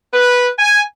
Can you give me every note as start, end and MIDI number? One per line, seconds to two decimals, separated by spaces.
0.13 0.49 71
0.57 0.83 80